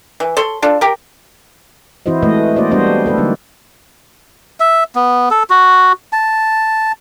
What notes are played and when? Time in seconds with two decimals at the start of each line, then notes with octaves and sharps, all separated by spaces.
0.20 E3
0.37 A4 C#5 C6
0.62 D4 F4 A4
0.81 G4 A#4
2.06 E3 C4 E4 F#4 C5 D#5
2.23 E3 G#3 A3 B4 D#5
2.56 A#3 F#4 C5 D5 D#5
2.71 G3 B3 D4 F#4 C5 D#5
3.06 A3 G4 A4 B4
3.18 D3 F#3 G3 A#3 D#4
4.60 E5
4.96 B3
5.31 A4
5.50 F#4
6.13 A5